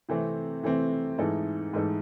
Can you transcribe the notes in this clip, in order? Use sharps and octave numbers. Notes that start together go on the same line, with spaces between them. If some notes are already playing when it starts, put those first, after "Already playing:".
C3 E3 A3 C4
C3 E3 A3 C4
G#2 E3 A3 D#4 A4
G#2 E3 A3 D#4 A4